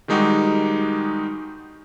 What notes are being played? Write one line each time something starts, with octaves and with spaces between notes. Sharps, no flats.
D#3 G3 G#3 D#4 F#4 G4